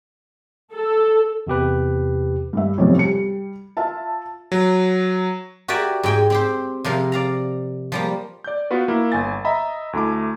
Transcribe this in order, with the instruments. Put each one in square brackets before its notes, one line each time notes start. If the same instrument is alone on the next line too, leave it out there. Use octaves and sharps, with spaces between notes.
[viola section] A4
[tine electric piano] E2 C3 G4 B4
[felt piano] G2 E5
B1 F2 A2 C3 F3
G3 C#7
F4 E5 A5
[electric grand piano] F#3
[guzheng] F#4 G4 A#4 D5 E5 G#5
G#2 G5 G#5
C4 G4 C5
C3 F3 A#4 F5
D5 F5 A#5
F3 G3 A#3
[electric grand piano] D5 G6
B3 F4 F#4 B4
A#3 E4
G1 G#5 A6
D#5 E5 A#5 B5
D2 A3 E4 D6